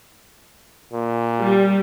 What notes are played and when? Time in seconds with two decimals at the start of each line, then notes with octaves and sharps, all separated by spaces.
0.92 A#2
1.39 G3